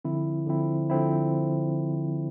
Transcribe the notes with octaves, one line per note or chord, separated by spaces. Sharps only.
D3 F3 C4 E4
D3 F3 C4 E4
D3 F3 C4 E4